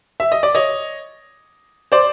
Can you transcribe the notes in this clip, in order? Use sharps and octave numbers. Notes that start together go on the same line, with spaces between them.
E5
D#5
D5
C#5 D#5
C5 D5